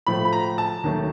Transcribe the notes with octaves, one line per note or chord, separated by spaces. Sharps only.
A2 F3 A3 B5
B5
A#5
A5
D#2 D#3 F#3 A3